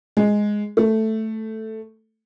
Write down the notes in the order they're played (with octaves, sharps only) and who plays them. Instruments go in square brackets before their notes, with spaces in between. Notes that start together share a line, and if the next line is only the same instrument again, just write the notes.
[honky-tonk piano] G#3
A3